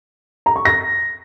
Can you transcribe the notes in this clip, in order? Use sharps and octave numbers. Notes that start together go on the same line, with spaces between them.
A#5
C#6
A#6